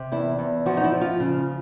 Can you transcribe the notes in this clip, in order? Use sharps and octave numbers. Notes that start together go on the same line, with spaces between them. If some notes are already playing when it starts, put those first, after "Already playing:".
Already playing: C3
E2 E4
E2
F3 F#4
D#4
E4
F3
F4
C#3